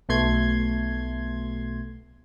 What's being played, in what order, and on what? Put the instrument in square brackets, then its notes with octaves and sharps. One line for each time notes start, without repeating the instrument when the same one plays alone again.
[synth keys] B1 B2 A3 C6 G#6